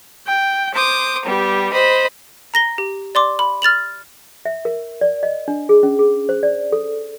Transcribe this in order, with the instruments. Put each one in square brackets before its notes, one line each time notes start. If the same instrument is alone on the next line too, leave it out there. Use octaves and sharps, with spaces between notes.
[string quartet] G5
C5 D6 D#6
G3 B3 G4
C5 D#5 B5
[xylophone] A#5 A#6 G7
G4
D5 C6 D6
B5
F6 A6 F7 F#7
[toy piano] E5
A#4
D5
D#5
D4
G#4
C#4
G#4
C5
D5
A4